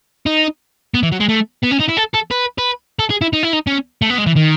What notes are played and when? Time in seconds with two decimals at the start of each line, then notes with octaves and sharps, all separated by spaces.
0.26 D#4
0.94 B3
1.03 E3
1.12 F#3
1.20 G#3
1.29 A3
1.63 B3
1.71 C#4
1.80 D#4
1.88 E4
1.97 A4
2.14 A4
2.31 B4
2.58 B4
2.99 A4
3.10 G#4
3.21 E4
3.33 D#4
3.43 E4
3.53 D#4
3.67 C#4
4.02 A3
4.10 B3
4.18 G#3
4.26 E3
4.36 D#3